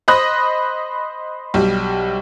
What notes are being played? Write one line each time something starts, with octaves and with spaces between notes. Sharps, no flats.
C5 D#5 B5 D#6 F#6 A#6
B1 G3